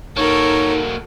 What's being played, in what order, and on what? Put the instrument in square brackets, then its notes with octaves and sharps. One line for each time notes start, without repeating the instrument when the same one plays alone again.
[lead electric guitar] A#3 F#4 [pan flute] D#4 [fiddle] A4 A#4 [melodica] C#5